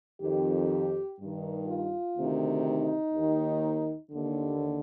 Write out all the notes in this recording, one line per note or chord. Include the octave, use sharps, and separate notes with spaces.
F2 D#3 G4
G2 D#3
F4
D2 C3 D#3
D#4
D#2 D#3
D#2 D3